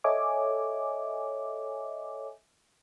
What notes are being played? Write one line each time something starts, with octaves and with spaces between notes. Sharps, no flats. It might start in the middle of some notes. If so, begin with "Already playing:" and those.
A4 C#5 D#5 E5 G#5 D6